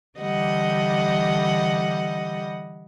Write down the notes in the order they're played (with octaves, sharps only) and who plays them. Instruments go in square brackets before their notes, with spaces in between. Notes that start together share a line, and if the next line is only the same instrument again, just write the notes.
[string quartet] D3 E3 G3 D#5 F#5